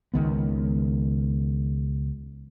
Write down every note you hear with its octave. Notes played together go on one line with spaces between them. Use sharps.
C#2 D#3 B3